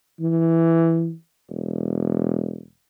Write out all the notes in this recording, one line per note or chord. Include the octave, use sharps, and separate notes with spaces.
E3
E1